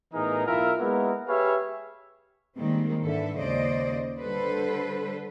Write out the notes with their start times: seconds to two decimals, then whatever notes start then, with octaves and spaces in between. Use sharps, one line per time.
0.13 A2 E3 B3 D#4 G#4 A#4
0.47 B1 E4 F4 A#4 E5
0.78 G#3 A#3 B3 E4 F#4 A#4
1.27 G4 G#4 B4 C#5 E5 F5
2.56 D#3 G3 G#3 A#3 C4
3.03 G#2 D3 E3 A4 E5
3.37 D#2 C#3 G#3 C5 D5 D#5
4.19 D3 G3 A4 B4 C5